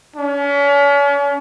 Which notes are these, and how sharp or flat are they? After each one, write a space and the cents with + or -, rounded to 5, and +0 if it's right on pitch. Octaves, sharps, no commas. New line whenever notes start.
C#4 +40